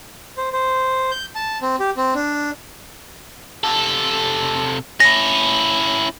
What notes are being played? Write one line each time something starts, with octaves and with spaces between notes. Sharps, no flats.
C5
C5
G6
A5
C4
G4
C4
D4
C3 A4
C#4 E4 A#6